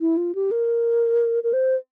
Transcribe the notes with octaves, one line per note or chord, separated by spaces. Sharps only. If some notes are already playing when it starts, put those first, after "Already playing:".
E4
F4
G4
A#4
A#4
C5